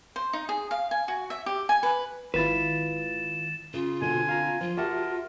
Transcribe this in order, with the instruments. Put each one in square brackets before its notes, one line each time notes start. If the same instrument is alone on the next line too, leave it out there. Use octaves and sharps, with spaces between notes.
[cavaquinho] C5
D#4
G#4
F5
G#5
F#4
E5
G4
G#5
B4
[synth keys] G#1 [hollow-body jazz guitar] E4 F4 B4 [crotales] A6 E7
[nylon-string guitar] C#3 [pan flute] F4
[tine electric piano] B2 [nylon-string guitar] D3 C4 [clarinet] G#5
[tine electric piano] F5 A#5
[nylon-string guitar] F3 [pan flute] F4
[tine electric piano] F#4 G4 A5 [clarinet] A#4 [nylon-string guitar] E5 F#5